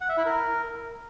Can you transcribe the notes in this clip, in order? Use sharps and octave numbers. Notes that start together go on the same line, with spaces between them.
F#5
E5
E4
A#4